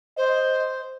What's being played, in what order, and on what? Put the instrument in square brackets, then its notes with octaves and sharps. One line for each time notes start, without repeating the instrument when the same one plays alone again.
[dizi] C5 [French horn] D#5